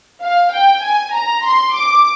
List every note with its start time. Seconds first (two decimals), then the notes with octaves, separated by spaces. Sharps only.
0.24 F5
0.54 G5
0.84 G#5
1.14 A#5
1.45 C6
1.75 D6